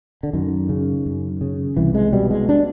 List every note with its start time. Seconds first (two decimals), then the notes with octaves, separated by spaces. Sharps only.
0.23 D3
0.33 F#2 D#3
0.69 C#3
1.06 F#2
1.41 C#3
1.77 C2 E3
1.95 G#3
2.13 B2 G3
2.31 G#3
2.49 D4